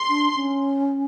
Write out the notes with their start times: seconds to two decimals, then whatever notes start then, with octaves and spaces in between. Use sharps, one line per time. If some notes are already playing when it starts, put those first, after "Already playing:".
Already playing: C6
0.09 D4
0.36 C#4